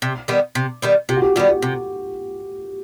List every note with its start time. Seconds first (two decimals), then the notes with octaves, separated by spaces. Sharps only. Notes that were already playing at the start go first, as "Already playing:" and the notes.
0.02 C3
0.28 D#3 G3 B3
0.55 C3
0.82 D#3 G3 B3
1.09 C3 G4
1.17 F#4
1.22 G4
1.35 D#3 G3 B3 G4
1.49 G4
1.62 C3